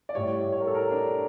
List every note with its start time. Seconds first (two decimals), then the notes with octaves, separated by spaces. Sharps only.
0.09 D5
0.15 A2 G3 C#5
0.52 C#5
0.60 A#4
0.67 A4
0.75 A#4
0.91 D4